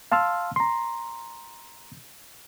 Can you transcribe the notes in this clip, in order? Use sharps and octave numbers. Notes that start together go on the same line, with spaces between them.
F5 A5 C6 E6 F6
A#5 C6